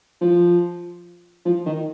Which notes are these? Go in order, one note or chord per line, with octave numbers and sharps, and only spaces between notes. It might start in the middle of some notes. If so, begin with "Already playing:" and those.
F3
F3
D#3